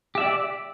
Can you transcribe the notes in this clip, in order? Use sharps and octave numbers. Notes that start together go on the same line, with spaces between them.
G4 D5 E5